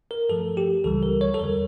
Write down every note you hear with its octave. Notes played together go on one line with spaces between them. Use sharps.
A#4
G2 F3 A3 A4
G4
C#2 C#3 E3 G3 A4
A#4
C#5
A4
E2 D3 G3 A#4